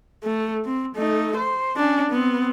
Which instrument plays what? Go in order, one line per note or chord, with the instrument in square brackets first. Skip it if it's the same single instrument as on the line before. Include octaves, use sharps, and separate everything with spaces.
[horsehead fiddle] A3
C4
A3 D#4
C5
C#4 D4
B3 C4